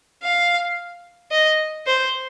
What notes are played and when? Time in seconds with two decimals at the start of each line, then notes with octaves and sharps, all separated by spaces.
0.23 F5
1.31 D#5
1.86 C5